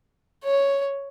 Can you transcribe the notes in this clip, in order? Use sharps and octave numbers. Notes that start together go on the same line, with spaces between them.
C#5